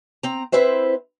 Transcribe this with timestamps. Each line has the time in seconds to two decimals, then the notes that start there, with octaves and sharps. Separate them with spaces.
0.23 C4 A#5
0.52 C4 E4 B4 C5 E5